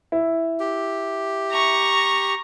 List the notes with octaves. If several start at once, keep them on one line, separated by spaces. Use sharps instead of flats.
E4
G4
A#5 C#6